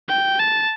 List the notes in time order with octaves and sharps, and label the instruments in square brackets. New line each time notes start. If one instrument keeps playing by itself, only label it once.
[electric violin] G5
A5